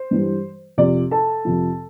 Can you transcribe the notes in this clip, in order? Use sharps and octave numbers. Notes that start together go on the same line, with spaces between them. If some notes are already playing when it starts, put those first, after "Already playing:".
Already playing: C5
G2 E3 G3
F2 C3 F3 D5
A4 A5
F2 C3 F3